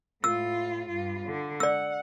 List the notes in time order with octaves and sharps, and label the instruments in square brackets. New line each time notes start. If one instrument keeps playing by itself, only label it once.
[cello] A2 F4 [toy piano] E6
[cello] G2 F4
D3
[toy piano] D5 E6 [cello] F#5